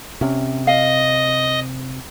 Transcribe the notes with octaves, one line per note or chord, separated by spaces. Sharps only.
C3 C#4
D#5 F5